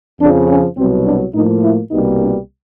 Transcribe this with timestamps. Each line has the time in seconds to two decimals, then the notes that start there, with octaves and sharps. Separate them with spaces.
0.20 F2 C#3 F3 D4
0.49 C#4
0.78 C2 B2 F#3 C4
1.06 D4
1.34 A2 F3 A#3 D#4
1.63 E4
1.91 C2 B2 G3 A#3 D#4
2.20 D4